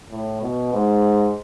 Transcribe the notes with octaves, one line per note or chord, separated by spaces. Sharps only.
A2
B2
G#2